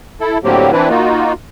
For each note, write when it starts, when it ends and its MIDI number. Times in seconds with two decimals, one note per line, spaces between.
0.20 0.38 64
0.20 0.38 69
0.44 0.71 45
0.44 0.71 50
0.44 0.71 54
0.44 0.71 58
0.44 0.71 60
0.44 0.71 67
0.72 0.89 52
0.72 0.89 60
0.72 0.89 62
0.72 0.89 64
0.72 0.89 71
0.89 1.33 58
0.89 1.33 63
0.89 1.33 65
0.89 1.33 66